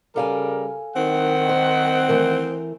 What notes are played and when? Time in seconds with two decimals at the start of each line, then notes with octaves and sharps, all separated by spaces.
0.16 C#3 G3 A4 A#4 F5 G#5
0.96 D#3 C4 F#5
1.49 C5
2.08 E3 A3 A#4